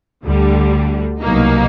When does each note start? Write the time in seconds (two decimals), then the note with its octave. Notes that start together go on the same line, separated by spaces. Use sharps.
0.23 D2 D3 G3
1.20 C2 B2 F#3 A#3 D#4